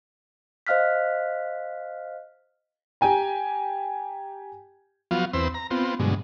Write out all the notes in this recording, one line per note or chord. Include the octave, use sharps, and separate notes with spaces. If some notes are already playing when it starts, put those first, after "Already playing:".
C5 D#5 F5 F6 F#6 B6
G4 G5 G#5 A#5
F3 F#3 B3 F4 F#4 F5
E2 C4 B4 C5 E6
A#5
B3 C4 F4
G2 B2 D3 F#3 G#3